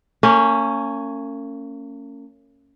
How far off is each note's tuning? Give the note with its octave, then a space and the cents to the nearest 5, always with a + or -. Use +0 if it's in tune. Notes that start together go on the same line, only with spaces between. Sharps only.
A#3 -40 C#4 +0